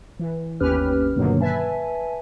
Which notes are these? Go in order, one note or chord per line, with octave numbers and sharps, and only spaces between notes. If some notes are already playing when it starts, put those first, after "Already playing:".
E3
G1 D#2 C#4 G4 B4 F6
G2 B2 D3 D#3 F#3 A#3
B4 E5 G#5 A5